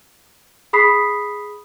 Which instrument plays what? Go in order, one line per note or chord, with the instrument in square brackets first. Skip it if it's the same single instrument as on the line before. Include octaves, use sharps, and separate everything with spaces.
[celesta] G#4 B5 D#6 B6 C7